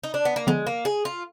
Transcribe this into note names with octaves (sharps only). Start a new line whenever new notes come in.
D#4
D4
B3
A#3
D3 F3 G#3 B3
A#3
G#4
F4